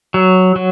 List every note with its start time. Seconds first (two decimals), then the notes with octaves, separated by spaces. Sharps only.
0.14 F#3
0.56 F#3